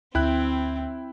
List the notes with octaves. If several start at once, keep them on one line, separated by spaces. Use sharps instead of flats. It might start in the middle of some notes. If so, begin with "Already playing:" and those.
D2 C4 E4 G5 F#6